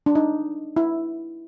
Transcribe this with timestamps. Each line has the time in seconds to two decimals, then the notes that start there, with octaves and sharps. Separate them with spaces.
0.06 D4
0.15 D#4
0.76 E4